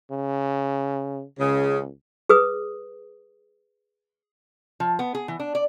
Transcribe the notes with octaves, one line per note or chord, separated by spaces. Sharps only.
C#3
C#2 C#3
G#4 B4 D#6
F3
B3
G#4
E3
D4
D5